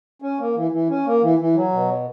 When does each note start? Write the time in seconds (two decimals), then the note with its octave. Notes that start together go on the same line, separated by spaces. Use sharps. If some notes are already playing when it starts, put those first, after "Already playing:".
0.22 C#4
0.39 A#3
0.56 E3
0.71 E3
0.89 C#4
1.06 A#3
1.22 E3
1.39 E3
1.56 F#3
1.72 B2